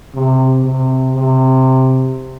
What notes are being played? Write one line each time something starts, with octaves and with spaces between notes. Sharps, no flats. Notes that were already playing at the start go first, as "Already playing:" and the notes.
C3
C3
C3